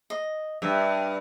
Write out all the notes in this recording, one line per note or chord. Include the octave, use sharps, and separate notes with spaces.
D#5
G2 E5